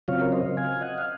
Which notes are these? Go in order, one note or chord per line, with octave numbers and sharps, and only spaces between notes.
C#3 F#3 C4 F4 C#5 F5
A#4 C#5
C5 D#5
F5 G#5
D#5 F#5
F5